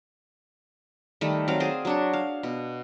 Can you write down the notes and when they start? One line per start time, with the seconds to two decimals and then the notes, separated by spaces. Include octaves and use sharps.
1.21 D#3 G3 A3
1.48 F#3 C4 F5
1.60 G#4 C5 D5
1.85 F#3 D4 C#5
2.13 F5
2.43 B2